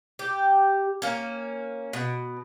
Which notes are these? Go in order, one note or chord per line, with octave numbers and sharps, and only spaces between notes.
G4
A#3 C#4
B2